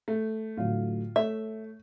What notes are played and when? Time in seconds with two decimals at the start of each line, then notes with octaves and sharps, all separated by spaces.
0.08 A3
0.57 A2 D3 F#3 F4
1.16 A3 C#5 E5